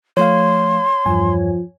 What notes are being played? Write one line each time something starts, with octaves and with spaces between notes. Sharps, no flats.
F3 A3 C#5 F5 C6
E2 G2 F3 G#5